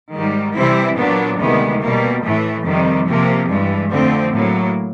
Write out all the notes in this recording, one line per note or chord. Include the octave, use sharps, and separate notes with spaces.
G#2 D#3 G3
C3 E3 G3 C4 E4
A#2 F#3 B3 D4
D2 C3 D#3 G#3 B3
B2 G3 A#3
A2 E3 A3
F2 C3 D#3 G3
C3 F3 A#3
G2 E3 G#3
F2 D3 F3 A3 C4
A2 F#3 A#3